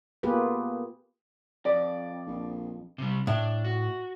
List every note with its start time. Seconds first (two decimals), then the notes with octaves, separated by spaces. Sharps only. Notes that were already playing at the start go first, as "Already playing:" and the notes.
0.23 A#3 B3 F4 G4 G#4 B4
1.65 F2 D5
2.27 A#1
2.98 C3 G3
3.27 A2 D4
3.64 F#4